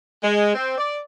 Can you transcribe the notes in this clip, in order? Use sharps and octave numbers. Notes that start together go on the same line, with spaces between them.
G#3
C4
D5